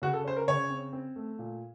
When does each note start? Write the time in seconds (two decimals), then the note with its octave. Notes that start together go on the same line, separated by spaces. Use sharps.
0.02 C#3 F#4
0.13 A4
0.24 C#4 C5
0.37 A#4
0.48 C#3 C#5
0.70 C4
0.93 C4
1.16 A3
1.39 A#2